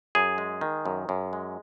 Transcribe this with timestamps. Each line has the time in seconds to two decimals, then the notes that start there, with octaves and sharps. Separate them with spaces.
0.15 F#2 G#4
0.38 G#3
0.61 D#3
0.86 F#2
1.09 F#2
1.33 G#3